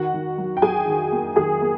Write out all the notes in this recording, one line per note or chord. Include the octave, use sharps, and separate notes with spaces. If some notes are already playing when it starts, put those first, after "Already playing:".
Already playing: D#3 F#4 F#5
D#3
F#3
G5
F#3 G#4 G#5
D#3
A#3
D#3 G#4 G#5
A#3